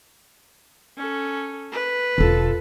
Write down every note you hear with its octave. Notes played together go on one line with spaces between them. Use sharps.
C#4 A4
B4
E1 C4 F4 A4